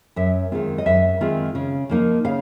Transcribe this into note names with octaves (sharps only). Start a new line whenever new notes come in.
F#2 E5
D#3 G#3 C4 F4
D#5
F#2 E5
D#3 G#3 C4 F4
C#3
F3 A#3 D#4
C#3 F5